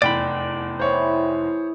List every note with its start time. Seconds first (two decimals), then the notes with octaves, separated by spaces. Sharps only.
0.02 F1 E2 D5 G5 B5
0.79 E3 E4 G#4 C5 C#5